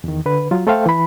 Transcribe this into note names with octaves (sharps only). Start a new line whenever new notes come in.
E2 D#3
D3 B4
F#3 F4
A3 A4 C5 E5 F5 G5
E3 B5